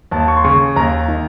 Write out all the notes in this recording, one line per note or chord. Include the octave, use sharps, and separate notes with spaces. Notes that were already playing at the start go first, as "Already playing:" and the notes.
D#2 A5
C#6
C6
C#3 C#6
D#2 A#5
D#3